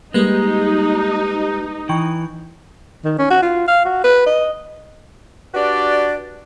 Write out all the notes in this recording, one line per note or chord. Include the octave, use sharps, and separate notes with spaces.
G3 G#3 A#3 D#4 G4 B4
E3 G5 C#6
D#3
C#4
F#4
F4
F5
F#4
B4
D#5
D4 F#4 G4 B4 D5